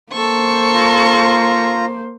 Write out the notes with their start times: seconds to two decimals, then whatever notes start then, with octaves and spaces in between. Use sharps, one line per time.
0.12 A#3 A4 C5 C#6
0.75 F4 A#5